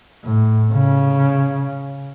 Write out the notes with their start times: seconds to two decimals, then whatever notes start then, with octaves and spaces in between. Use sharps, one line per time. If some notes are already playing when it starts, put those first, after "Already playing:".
0.24 A2
0.72 C#3